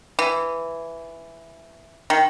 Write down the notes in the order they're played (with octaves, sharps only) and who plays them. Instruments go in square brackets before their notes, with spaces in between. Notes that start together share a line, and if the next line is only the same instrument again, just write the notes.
[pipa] E3
D#3